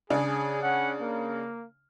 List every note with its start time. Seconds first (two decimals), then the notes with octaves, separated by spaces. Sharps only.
0.10 C#3 D4 G#4
0.63 C#4 F#5
1.00 A#3